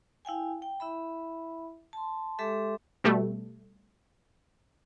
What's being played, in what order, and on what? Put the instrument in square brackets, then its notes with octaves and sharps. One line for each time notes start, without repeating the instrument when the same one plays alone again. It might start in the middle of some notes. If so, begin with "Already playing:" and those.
[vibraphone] E4 F5 G5 G#5
G5
E4 E5 B5
A5 C6
G#3 G4 A4 E5 C6 D6
[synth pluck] B2 G3 A3